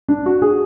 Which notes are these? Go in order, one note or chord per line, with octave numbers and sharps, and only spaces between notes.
D4
F#4
G#4